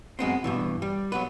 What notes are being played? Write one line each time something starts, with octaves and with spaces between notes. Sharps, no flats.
F#2 G#3 B3 C4
G2 B2 E3
G3
F#3 B3 B4